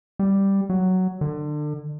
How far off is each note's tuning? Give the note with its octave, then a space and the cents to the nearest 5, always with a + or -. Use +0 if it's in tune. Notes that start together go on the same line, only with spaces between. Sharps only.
G3 +0
F#3 +5
D3 +30